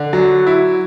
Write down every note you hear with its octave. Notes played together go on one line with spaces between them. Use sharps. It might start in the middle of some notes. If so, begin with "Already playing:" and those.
Already playing: D3
F#3
E4